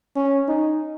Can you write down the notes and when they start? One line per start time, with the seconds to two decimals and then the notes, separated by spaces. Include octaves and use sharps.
0.16 C#4
0.48 D#4